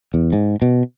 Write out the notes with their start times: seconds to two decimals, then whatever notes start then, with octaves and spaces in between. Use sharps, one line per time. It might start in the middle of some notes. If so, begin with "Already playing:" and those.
0.14 E2
0.33 G#2
0.62 B2